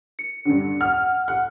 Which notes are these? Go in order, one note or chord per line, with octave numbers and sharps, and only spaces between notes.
C#7
G2 D3
F#5 F6
F#5